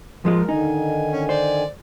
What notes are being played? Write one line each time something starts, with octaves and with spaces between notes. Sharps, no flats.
F3 G#3 F4 A#4
D3 D#3 D#4 G#5
C#4
C5 D5